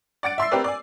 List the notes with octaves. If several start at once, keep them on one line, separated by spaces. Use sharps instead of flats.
D5 F#5 A6 D7
E5 C6 E6 C7
C4 G4 A#4 B4 D5
D5 G#5